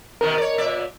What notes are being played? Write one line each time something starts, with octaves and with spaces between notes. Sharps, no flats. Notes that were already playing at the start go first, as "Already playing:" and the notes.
B2 D#3 B3 A#4
C#5 D5
A#2 D5 E5